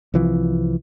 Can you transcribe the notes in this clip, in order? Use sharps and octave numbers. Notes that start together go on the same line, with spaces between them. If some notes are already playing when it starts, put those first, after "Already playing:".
C2 E3 F3